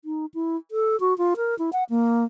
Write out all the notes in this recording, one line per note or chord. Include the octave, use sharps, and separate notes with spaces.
D#4
E4
A4
F#4
F4
A#4
E4
F#5
A#3